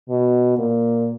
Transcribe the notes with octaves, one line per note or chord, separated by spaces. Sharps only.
B2
A#2